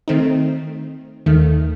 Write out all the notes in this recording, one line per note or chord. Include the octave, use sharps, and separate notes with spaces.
D#3 A3 C4 D#4
D#2 D#3 A3